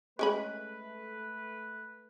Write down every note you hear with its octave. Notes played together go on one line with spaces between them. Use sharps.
G#3 A3 C#4 B4 B5